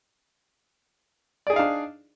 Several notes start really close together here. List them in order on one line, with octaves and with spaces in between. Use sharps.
D5 G#4 D#4 F5 D4